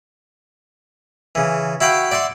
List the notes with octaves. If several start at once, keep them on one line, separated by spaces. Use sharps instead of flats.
C#3 E3
E4 F#4 F5 G5 B5
D5 E5 F#5 C6